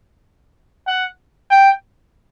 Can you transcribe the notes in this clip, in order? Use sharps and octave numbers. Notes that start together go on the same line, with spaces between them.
F#5
G5